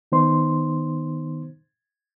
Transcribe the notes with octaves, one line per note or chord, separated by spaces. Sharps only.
D#3 B3 D#4 C5 C6